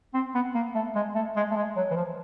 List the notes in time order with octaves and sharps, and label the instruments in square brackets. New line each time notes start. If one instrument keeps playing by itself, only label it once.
[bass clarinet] C4
B3
A#3
A3
G#3
A3
G#3
A3
G#3
F#3
E3
F3